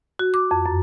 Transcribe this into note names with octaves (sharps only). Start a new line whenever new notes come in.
F#4
D6
F2
F#2